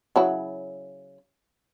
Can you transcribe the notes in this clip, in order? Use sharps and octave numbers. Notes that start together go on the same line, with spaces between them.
C#3 F#3 E4